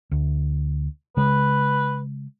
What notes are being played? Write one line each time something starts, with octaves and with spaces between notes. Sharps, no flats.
D2
C#3 G#3 B4